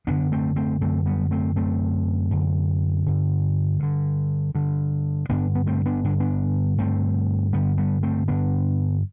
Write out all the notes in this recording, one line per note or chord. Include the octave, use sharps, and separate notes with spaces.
F#2 D3 B3 D4
A3 C4
A3 C4
F#2 D3 A3 C4
G3 B3
A3 C4
F#2 D3 A3 C4
F#2 D3
G2 D3
G2 D3
G2 D3
G2 D3 B3 D4
B3
A3 C4
B3 D4
G2 D3 D4
B3 D4
G2 D3 A3 C4
G2 D3 G3 B3
G3 B3
A3 C4
G2 D3 B3 D4